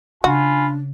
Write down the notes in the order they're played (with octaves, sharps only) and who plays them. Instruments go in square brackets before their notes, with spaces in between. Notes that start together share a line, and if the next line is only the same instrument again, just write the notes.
[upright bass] C#3 [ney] D4 [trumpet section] F4 G#5 B5 [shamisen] F#4